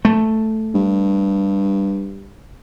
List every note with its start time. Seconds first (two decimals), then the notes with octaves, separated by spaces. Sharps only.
0.05 A3
0.75 G2